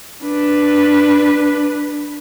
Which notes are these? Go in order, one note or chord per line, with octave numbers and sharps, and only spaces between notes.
D4 B4